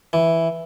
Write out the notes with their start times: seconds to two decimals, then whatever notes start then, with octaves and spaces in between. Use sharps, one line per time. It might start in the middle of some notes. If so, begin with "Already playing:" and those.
0.13 E3